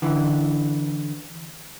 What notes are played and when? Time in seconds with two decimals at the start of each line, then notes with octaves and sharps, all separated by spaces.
0.02 D3 E3